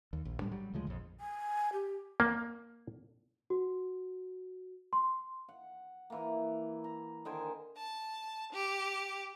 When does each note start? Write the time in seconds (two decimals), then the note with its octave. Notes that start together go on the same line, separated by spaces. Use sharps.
0.13 D#2
0.25 A#1
0.40 A2 G3 D4
0.51 F#3 G3
0.74 D2 C#3 F3 G#3
0.87 A#1 F2
1.20 G#5
1.73 G4
2.20 A#3
3.50 F#4
4.93 C6
5.48 F#5
6.10 E3 A#3
6.84 A#5
7.25 D3 D#3 C5 G#5
7.77 A5
8.53 G4